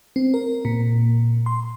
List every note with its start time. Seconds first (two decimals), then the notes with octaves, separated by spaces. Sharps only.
0.16 C4
0.34 A#4
0.65 A#2
1.46 C6